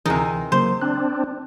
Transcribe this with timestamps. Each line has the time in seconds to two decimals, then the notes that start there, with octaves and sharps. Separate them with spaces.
0.06 D2 C3 E3 D#4 G#4 A#4
0.52 C#3 F#3 A#3 C5
0.82 C4 D4 F#6